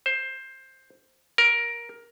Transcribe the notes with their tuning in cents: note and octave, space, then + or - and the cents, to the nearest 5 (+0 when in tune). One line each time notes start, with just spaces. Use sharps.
C5 +10
A#4 +15